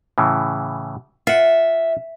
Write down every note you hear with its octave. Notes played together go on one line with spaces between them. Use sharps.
A2 C#3 E3
F4 E5 F#5